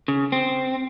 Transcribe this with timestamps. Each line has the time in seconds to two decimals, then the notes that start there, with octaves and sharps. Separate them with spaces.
0.08 C#3
0.32 C4